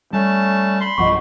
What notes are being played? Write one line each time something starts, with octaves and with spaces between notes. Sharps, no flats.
G3 A3 C#4 A5
B5 C6
B1 G2 F3 D#5 F#5 C#6